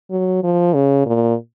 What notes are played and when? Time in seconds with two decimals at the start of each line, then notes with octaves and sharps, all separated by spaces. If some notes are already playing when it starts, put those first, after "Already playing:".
0.11 F#3
0.43 F3
0.74 C#3
1.06 A#2